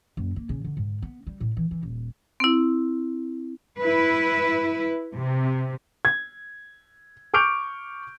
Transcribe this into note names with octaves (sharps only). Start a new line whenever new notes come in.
F#1
A#3
C#3
D3
G#2
B3
G3
A2
E3
E3
D#1
C4 E4
E4 B4
C3
G#6
C#6 D6 F6 G6 D7 F7